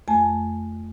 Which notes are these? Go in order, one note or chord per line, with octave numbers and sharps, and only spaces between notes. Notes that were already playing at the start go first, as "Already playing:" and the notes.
F2 A3 G#5 A5